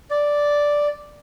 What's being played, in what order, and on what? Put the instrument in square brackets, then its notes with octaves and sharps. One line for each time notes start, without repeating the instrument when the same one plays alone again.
[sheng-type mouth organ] D5